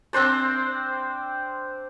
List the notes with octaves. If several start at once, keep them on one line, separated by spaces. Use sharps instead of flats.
C4 D4 C5 D5